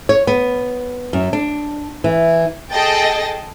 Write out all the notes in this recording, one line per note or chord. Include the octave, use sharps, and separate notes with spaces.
C#5
B3
F#2
D4
E3
G#4 A4 D#5 G5 A6